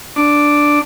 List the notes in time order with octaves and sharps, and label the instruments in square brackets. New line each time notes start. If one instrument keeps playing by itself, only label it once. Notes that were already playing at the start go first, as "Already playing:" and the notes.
[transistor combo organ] D4